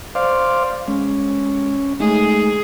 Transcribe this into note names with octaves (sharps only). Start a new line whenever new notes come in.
C5 D5 F5
G#3 C#4
G#3 A3 D#4 G#4